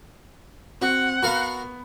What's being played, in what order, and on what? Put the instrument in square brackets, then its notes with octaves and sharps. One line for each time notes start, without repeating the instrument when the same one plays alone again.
[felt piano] C4 [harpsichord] F#4 [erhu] F#5
[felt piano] B3 B5 [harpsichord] F#4 A#4 F5